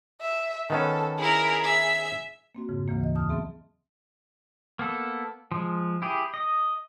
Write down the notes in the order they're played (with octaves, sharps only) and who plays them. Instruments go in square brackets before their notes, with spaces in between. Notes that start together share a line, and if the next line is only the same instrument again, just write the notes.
[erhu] E5
[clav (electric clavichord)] D#3 B3 C#4 [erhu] A4
[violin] E4 A#4 [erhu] G#4
[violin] E5
[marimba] A#3 C4 F#4
F2 G#2 C#3
D2 C#3 E3 A#3
E3 D#5
E2 A5 D#6 F6
F#3 B3 C4 G#4 E5
[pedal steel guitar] A#3 B3 A4
F3 G#3
E4 G4 G#4
D#5